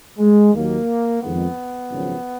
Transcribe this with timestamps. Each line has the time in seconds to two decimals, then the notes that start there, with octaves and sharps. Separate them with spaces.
0.19 G#3
0.54 D#2 D#3 F#3 A#3
1.22 F2 D#3 G#3 B3
1.90 G#1 F#2 C#3 F3